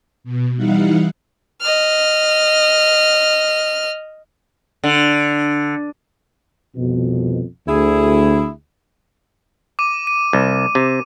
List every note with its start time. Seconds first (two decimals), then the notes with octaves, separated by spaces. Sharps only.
0.24 B2
0.57 E3 G3 D#4 E4 F5 F#5
1.61 D#5 F6
4.84 D3
6.76 C2 F2 B2
7.67 D2 E4 G#4
9.79 D6 D#7
10.07 D#7
10.33 C2
10.75 C3